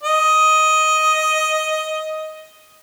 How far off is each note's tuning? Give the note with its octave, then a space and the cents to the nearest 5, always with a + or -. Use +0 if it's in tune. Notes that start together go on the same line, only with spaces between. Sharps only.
D#5 +10